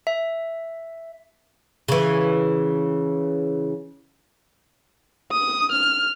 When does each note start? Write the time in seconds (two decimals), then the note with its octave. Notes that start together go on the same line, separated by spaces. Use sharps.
0.07 E5
1.88 C#3 E3
5.32 D#6
5.72 F6